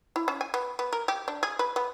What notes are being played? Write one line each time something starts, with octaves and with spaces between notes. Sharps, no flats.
E4
C#4
G#5
B3
B3
A#4
G4
D4
G#4
B4
B3